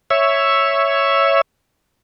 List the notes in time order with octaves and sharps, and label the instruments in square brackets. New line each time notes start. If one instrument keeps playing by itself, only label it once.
[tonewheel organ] C#5 E5